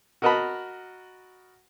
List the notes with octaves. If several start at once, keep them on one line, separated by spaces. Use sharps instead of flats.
F#4 A#4 D#5 F#5 A5 B5